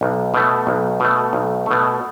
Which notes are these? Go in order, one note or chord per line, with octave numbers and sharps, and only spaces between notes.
B1
B2 A3
B1
B2 A3
B1
B2 A3